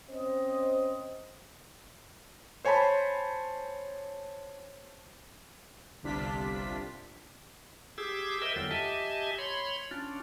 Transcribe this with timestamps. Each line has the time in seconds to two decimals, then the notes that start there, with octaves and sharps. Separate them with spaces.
0.10 C4 C#4 C5 D#5
2.65 C5 C#5 G#5 A5 B5 C6
6.03 G1 C2 C3 D4 F4 B6
7.98 G4 G#4 D6 E6
8.42 A#4 C5 D#5 E5 G5 E6
8.56 E2 D3 F#3 F4 G5 E6
8.71 G4 D#5 E5 G#5 A5
9.38 C#5 B5 C6
9.91 C#4 D4 F4